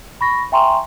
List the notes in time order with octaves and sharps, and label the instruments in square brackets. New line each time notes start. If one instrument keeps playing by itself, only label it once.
[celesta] B5 C#6 A#6
E5 G5 G#5 A#5 C6 C#6